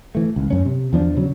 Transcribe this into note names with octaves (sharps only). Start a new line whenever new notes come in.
E3 A3
C#2
F#2 C#4
C3
E2 F3 D4
C#3 F#3